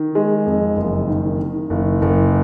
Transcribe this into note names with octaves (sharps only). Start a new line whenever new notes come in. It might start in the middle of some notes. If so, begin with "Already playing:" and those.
Already playing: D#3
G#3
F2
F#1
D#3
D#3
F#1
F#1